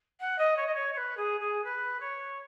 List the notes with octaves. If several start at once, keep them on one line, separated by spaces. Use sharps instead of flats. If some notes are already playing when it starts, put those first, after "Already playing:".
F#5
D#5
C#5
D#5
C#5
C#5
B4
G#4
G#4
B4
C#5